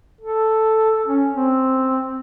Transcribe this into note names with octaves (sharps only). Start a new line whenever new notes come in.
A4
C#4
C4